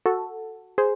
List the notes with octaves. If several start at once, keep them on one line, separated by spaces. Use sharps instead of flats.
F#4 A4
G#4 C5